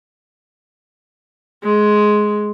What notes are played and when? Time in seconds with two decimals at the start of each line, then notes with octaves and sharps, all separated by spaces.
1.63 G#3